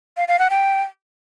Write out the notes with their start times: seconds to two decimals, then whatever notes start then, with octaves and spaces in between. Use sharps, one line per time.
0.17 F5
0.28 F5
0.39 F#5
0.50 G5